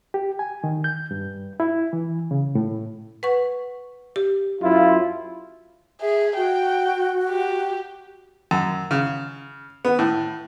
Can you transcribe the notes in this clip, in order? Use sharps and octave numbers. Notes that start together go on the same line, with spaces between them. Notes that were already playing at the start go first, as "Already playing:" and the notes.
G4
G#5
D#3
G6
G2
E4
E3
C#3
A2
B4 F#5 C#6
G4
F#2 E4 F4
G#4 E5
F#4 G5
G4
F#2
C#3
B3
A2